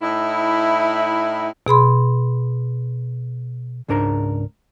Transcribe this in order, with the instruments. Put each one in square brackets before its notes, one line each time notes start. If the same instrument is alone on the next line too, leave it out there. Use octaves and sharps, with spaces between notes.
[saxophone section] A2 D#4 E4
[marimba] B2 G#4 B5 C6
[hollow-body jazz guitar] C#2 G#2 D4 A#4 A#5